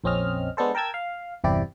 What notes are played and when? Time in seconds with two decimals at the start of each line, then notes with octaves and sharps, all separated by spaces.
0.04 A#1 F2 C4 C#4 D#5 F6
0.57 G#3 B3 D4 A4 C5
0.75 A#4 G5 A5 E6 G#6
0.94 F5
1.44 G1 E2 C3 E4 G4 D5